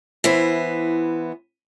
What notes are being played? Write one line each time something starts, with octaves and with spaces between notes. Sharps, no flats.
E3 B3 E4 C5